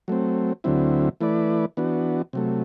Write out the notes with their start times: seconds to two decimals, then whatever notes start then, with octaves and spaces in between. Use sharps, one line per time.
0.08 F#3 A3 C4
0.64 D2 D3 F#3 C4 E4
1.21 E3 A3 E4 B4 D5
1.77 E3 B3 D4 F#4
2.33 C3 F#3 A3